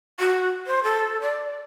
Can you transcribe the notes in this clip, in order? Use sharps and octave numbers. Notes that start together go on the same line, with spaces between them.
F#4
C5
A4
D5